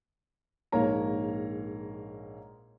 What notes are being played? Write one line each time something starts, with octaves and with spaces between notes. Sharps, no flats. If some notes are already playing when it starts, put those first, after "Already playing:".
A#1 G#2 A#3 C#5 A#5